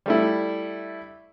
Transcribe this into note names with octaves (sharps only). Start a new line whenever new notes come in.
G3 A3 E4